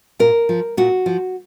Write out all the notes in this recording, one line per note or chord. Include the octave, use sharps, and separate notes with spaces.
A#2 A#4
F3
A#2 F#4
F3